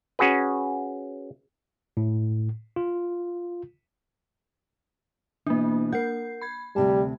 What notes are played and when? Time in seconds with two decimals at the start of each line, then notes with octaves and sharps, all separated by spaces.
0.19 C#4 F#4 G#4 B4
1.97 A2
2.76 F4
5.47 B2 E3 A#3 D4
5.92 A#4 F#5 G6 C7
6.42 B5 G#6
6.76 D2 C3 G3 A5